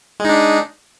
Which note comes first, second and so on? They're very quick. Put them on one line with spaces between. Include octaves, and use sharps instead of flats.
G#3 D#4 D4